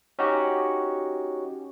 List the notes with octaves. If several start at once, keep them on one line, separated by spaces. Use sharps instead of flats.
C#4 D#4 F#4 G4